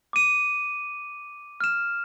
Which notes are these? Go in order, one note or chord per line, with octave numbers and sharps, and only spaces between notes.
D6 D#7
F6 E7